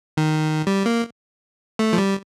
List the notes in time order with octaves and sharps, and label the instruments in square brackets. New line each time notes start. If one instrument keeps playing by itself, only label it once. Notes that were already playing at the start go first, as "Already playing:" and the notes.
[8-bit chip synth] D#3
G3
A#3
A3
F3
G3